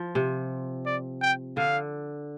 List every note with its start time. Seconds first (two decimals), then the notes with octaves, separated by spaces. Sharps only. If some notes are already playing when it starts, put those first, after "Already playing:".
Already playing: F3
0.15 C3
0.86 D5
1.22 G5
1.57 D3 F5